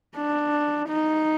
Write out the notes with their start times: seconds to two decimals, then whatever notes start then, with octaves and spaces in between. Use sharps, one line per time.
0.17 D4
0.89 D#4